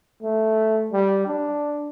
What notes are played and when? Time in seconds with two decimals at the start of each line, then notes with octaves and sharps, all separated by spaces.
0.23 A3
0.92 G3
1.26 D4